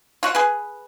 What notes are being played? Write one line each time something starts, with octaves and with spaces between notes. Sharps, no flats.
F4 F#4 F#5
G#4 B4